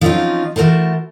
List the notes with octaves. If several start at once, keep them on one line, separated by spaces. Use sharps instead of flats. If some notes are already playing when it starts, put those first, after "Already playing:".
F3 F#3 C4 C#4 D#4 F4
E3 A3 F#4 A#4 C5 A5